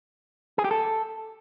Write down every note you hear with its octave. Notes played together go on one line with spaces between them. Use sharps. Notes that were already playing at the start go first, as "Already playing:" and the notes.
G#4
G4
A4